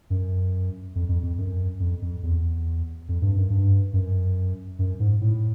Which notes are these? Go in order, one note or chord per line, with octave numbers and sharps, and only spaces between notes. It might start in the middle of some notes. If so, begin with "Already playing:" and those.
F#2
F2
F2
F2
F#2
F2
F2
E2
F2
G2
F#2
G2
F#2
F#2
G#2
A2